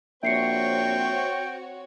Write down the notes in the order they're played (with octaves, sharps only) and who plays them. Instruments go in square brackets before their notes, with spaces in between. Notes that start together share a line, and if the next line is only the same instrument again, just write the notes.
[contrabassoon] A#1 [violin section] C4 F#4 C#5 [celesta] E5 C7 C#7 [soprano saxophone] G5